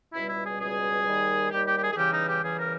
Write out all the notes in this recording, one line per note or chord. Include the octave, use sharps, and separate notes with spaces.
C#2 B2 G3 E4
E4
G#4
C#2 B2 G3 G#4
D#2 D#3 G3
D#2 D#3 G3 G4
G4
G4
G#4
G#4
E2 C#3 E3 G3 G4
D#4
G4
E2 C#3 E3 G3 G#4
A#4